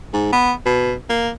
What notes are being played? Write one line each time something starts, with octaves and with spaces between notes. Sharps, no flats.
G#2
B3
B2
A#3